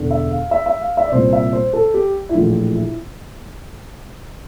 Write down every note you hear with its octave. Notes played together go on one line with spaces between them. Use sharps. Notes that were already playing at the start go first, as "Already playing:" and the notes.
Already playing: E1 E2 D3
E5
F5
E5
E5
F5
E5
D5
C2 A#2 C5
E5
C5
A4
G4
E4
A#1 A2 E3 F4
E4